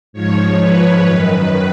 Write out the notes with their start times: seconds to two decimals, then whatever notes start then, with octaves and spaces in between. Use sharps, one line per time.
0.13 G#2 F3 C#5
0.58 B4
1.04 F#2 D#3